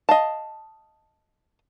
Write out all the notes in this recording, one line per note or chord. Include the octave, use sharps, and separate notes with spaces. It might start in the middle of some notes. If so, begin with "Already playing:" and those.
D#5 F5 A5